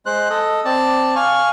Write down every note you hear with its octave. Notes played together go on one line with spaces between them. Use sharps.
G#3 C5 F#6
A4 D#5
C4 D5 A5
F5 G#5 C#6